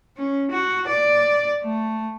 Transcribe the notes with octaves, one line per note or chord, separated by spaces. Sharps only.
C#4
F#4
D5
A3